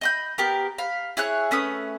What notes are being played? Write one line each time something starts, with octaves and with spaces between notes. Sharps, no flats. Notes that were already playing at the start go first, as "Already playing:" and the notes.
D#5 B5 G6
B3 G4 A#4
F5 B5
E4 G#4 C#5 F#6
A3 C#4 B4 D#6